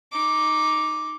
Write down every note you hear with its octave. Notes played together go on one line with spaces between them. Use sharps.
D#4 D6